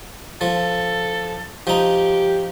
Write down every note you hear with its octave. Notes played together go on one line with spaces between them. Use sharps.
F3 A4
F3 D#4 G4